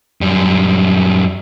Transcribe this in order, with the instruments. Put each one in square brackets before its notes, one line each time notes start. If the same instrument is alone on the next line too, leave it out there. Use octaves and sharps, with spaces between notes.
[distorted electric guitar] F#2 G3